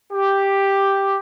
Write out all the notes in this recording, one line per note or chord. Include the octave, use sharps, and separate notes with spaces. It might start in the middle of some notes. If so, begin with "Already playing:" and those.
G4